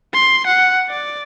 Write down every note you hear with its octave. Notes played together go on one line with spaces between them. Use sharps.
C6
F#5
D5